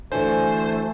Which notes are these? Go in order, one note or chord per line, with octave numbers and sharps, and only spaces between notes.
D3 E3 A3 F#4 C5 G#5